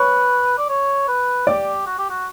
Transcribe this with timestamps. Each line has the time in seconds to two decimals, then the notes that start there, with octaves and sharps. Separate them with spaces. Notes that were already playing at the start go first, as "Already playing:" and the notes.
Already playing: B4 C#5 C#6
0.58 D5
0.69 C#5
1.08 B4
1.47 G4 D5 D6
1.86 F#4
1.98 G4
2.10 F#4